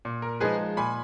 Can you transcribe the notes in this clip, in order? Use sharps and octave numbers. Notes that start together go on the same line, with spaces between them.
A#2
A#4
F3 G#3 D#4 G#4 B4
A#2 G#5 B5